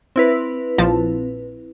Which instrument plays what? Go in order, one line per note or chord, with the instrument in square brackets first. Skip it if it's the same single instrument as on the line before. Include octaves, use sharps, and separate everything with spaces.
[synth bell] C4 E4 B4
[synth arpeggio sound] A#1 F3 A5